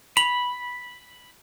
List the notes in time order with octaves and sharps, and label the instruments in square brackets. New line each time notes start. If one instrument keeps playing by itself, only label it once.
[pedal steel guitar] B5 [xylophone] F7 F#7